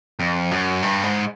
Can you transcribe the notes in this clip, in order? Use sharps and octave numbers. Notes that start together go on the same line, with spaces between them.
F2
F#2
G2
G#2